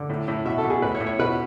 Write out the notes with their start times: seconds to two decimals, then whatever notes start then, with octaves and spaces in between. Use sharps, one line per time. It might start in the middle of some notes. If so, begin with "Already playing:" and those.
Already playing: D3
0.09 A2
0.28 A2
0.45 B2 E5
0.58 A4
0.64 B2
0.70 G#4
0.82 A2 B4
0.95 C#5
1.00 A2
1.07 C#5
1.19 B2 B4